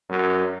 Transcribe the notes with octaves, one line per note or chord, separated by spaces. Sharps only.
F#2